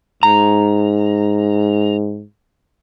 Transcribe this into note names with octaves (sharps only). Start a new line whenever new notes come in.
G#2 A#5